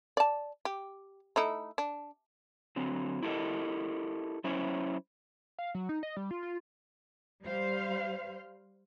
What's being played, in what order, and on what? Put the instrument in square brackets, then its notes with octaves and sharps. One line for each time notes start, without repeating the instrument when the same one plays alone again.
[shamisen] D5 A5
G4
A3 D#4 E4
D4
[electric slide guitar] D3 F#3 C4
E4 G4 A4 A#4 D#5
F#3 C#4 E4 C5 C#5
[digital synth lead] F5
F#3
D#4
D#5
G3
F4
F4
[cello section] G3 C5 F5